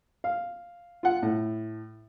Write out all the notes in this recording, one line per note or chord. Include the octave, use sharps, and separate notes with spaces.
F5
F4 F#5
A2